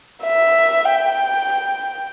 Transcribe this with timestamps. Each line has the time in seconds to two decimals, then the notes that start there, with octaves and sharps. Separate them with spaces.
0.24 E5
0.85 G5